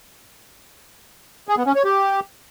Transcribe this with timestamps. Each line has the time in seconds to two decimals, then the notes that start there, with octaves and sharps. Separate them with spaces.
1.48 G#4
1.57 B3
1.66 C#4
1.75 C#5
1.84 G4